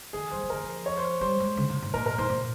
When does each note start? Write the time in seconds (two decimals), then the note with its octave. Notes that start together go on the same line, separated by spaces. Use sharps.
0.13 D#3 G#4
0.31 G3 C5
0.42 F3
0.50 D#3 A#4
0.63 F3
0.86 C#5
0.97 C5
1.21 G3 C5
1.40 G#3
1.57 C#3
1.69 C3
1.82 G#2
1.94 A#2 A#4
2.06 A#4
2.18 G#2 C5
2.30 A#2